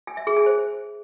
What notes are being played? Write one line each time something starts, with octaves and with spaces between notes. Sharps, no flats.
G#5
E5
G#4
G#5
C5